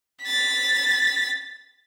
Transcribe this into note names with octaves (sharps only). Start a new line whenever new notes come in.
A6 B6